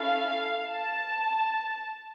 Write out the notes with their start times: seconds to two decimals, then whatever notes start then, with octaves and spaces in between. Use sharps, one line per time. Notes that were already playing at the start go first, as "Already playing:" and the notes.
Already playing: C#4 E4 A4 F5
0.70 A5